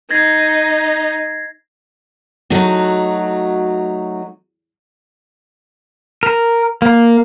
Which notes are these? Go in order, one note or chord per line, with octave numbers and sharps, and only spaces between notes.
D#4 G#6 A#6 C7
F#3 A3 D#4 F#4
A#4
A#3